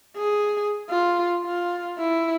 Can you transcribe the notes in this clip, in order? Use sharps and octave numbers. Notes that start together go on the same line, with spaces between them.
G#4
F4
F4
E4